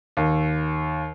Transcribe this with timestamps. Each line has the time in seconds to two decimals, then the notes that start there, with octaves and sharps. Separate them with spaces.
0.17 D#2